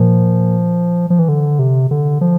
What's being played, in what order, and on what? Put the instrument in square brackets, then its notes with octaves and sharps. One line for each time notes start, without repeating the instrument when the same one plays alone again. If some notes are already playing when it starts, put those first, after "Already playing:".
Already playing: [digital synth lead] A#2 [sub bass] F3
[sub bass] F3
E3
D3
C3
D3
F3